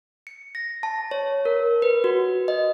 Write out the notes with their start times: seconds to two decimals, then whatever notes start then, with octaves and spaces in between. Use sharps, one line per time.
0.27 C#7
0.55 A#6
0.83 A5
1.11 C#5
1.45 A#4
1.82 B4
2.04 F#4
2.48 D#5